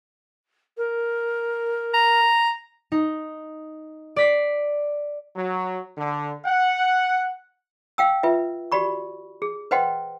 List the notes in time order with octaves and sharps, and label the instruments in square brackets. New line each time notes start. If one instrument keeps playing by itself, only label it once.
[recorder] A#4
[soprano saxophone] A#5
[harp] D#4
D5 B6 C7
[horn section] F#3
D3
F#5
[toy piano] F5 G5 E6
F4 B4 E5
F#4 G4 D5 B5 C#6
G#4
B4 C5 D#5 F#5 G5 C6